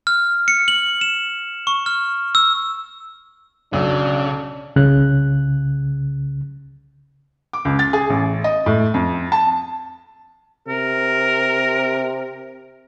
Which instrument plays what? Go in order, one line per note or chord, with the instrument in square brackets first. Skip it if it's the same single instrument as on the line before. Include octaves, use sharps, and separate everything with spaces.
[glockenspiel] F6
C#7
F#7
E7
C#6
F6
E6
[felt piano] B1 F#3 E6 [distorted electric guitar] C#3 [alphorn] D4
[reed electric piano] C2 C#3 F#6
[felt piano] D6
C#2
A6
G#4
A1
D#5
A2
F2
A5
[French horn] C3 [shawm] A#4